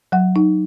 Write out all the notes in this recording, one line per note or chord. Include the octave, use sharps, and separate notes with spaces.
F#3 F#5
D#4